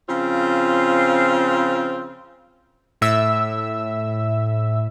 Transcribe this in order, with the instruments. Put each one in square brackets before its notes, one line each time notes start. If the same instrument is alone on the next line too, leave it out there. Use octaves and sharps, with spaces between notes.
[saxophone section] C#3 F3 C4 F4
[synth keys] A2 E5 E6